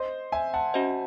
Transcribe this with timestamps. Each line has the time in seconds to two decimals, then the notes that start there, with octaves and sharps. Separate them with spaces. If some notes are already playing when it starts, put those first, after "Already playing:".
Already playing: C5 D#5
0.32 E5 G#5
0.54 F#5 A5
0.74 C#4 F#4 C5 D#5